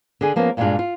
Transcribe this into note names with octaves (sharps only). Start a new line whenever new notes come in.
D3 G#4 G#5
F3 A#3 B3 C#4
G2 A#2 G3 G#3 D4 F4
F4